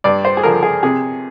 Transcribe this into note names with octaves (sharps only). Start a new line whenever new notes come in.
G2 D5
C5
G#4
D3 F3 A#4
G#4
C3 G#4